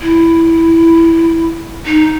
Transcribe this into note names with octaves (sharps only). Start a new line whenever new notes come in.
E4
D#4